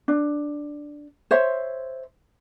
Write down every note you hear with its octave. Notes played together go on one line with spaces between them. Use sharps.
D4
C5 C#5 E5